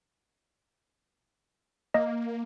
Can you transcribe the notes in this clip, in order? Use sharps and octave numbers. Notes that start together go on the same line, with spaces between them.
A#3 D#5